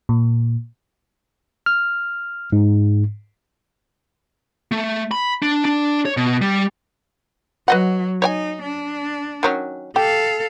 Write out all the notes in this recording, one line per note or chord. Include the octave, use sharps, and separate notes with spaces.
A#2
F6
G#2
A3
B5
D4
D4
C#5
B2
G3
F#3 B4 D#5 F#5
D#4 C#5 D5 G#5
D4
D#3 F#3 C#4
G4 A4 F5